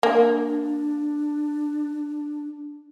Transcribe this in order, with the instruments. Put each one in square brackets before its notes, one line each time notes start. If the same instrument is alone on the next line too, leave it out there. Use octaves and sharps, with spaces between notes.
[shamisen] A#3 [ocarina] D4